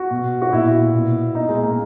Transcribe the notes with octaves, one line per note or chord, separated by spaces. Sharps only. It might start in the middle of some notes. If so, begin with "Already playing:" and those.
Already playing: F#4
B2
F#4
A#2 E4
B2
A#2 D#4
G#3
A#3